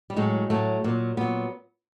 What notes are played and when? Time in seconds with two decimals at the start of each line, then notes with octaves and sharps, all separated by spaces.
0.10 G3
0.16 A2 F#3 G#3
0.50 A2 F#3 A3
0.84 A#2 F#3
1.17 A#2 F#3 B3